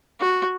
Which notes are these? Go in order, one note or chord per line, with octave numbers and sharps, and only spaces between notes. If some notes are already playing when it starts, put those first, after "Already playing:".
F#4